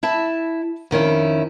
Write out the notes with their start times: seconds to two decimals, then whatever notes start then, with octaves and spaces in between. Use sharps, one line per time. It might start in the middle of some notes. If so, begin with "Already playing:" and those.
0.03 E4 E5 A5
0.91 F2 D#3 C#4 E4